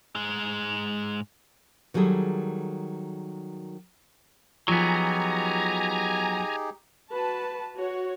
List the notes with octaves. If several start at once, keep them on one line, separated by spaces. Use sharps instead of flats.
G#2 G#3
D#3 F#3 G3 G#4 A4
F3 F#3 B3 D#4 G4 G#4 G#5 A#5
F#4 B4 A5
F#4 C#5